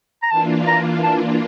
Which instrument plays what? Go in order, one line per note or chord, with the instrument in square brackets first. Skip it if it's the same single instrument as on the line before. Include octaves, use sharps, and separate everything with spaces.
[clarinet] A#5
[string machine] E3 A#3 D4 F4 [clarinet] A5
[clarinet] A#5
A5